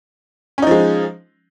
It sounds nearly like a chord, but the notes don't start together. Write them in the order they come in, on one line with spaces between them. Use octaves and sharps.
C#4 D#4 F3 G#3